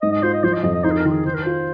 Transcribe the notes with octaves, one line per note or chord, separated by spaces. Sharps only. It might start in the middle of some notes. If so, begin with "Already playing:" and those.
G#2 D#5
D#5
F4 C5
D#5
F3 C5
D#5
F2 D#5
D#5
D#4 C5
G#4
A#4
D#3 F4
G#4
D#3 C5
A#4
F4 C5